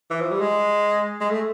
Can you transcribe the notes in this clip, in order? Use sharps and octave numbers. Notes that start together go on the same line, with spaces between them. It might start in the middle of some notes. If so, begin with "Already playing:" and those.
E3
F3
G3
G#3
G#3
A3